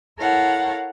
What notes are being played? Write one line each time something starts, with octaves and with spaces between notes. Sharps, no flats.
E4 A4 A#4 C#5 F5 F#5